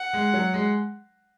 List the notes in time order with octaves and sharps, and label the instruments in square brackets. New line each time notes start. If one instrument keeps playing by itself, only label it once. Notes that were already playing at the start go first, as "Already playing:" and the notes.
Already playing: [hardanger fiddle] F#5
[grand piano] G#3
F#3
G#3